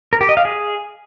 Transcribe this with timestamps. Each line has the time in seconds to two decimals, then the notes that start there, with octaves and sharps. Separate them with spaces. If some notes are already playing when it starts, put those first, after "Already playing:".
0.13 A#4
0.21 G4
0.29 D#5
0.37 F5
0.45 G#4